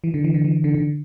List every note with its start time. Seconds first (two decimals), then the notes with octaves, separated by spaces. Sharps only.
0.04 E3
0.14 D3
0.24 E3
0.34 D3
0.45 E3
0.64 D3
0.74 D3